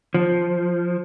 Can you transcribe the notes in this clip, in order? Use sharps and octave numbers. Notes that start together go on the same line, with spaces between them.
F3